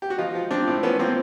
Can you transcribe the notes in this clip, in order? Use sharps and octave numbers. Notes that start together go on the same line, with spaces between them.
G4
F#4
F3 D#4 F4
F3
F3 C4 D4
A2
F3 B3 C#4
F3 A#3 C4